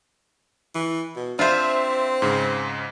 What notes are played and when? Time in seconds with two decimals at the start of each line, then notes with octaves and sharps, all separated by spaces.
0.75 E3
1.16 B2
1.39 C4 D4 F4 C5 E5
2.22 G#2 C#3